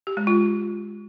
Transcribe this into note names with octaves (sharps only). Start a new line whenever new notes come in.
G4
G#3
F4